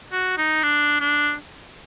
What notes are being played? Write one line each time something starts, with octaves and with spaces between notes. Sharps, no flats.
F#4
D#4
D4
D4